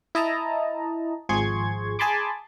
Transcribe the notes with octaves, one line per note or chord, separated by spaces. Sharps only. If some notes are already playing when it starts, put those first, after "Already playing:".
E4 D#5 A5 A#5
G#1 F3 G#4 C6 C#6 G#6
G#4 G#5 A5 B5 C6 D6